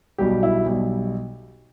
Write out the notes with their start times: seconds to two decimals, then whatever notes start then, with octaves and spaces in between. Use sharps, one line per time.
0.18 B1 B2 G3 G4
0.43 E4
0.66 B1 B2 G3